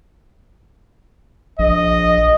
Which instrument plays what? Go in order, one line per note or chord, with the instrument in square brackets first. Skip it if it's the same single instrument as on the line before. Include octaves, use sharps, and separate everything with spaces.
[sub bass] A#1 [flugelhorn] D#5